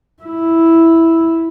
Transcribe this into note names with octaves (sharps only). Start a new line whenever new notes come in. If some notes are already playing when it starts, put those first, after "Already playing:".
E4